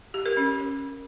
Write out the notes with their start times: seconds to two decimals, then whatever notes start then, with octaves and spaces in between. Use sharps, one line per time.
0.14 G4
0.26 A#4
0.37 C#4